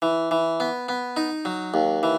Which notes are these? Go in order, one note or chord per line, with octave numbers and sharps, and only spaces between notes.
E3
E3
B3
B3
D#4
F#3
D#2
E3